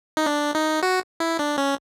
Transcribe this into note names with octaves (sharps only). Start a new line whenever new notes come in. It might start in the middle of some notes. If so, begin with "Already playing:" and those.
D#4
D4
D#4
F#4
E4
D4
C#4